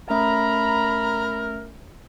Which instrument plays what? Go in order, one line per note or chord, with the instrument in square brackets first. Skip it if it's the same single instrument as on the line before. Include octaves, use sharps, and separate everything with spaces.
[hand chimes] A3 C#4 E5 [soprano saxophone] A#4 [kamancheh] A#5 B5